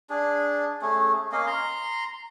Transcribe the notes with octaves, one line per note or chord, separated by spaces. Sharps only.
D4 G#4
A3 C#4 G#4
A#3 C#4 D#5 F5
A#5 C6